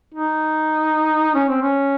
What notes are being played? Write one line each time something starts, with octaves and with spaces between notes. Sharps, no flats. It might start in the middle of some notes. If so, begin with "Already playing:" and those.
D#4
C#4
C4
C#4